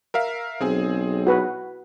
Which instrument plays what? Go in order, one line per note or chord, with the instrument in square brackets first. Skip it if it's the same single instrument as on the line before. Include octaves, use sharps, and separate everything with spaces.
[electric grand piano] A#4 E5 F5
[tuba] B1 [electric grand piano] C4 G#4 G#5
[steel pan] F#4 B4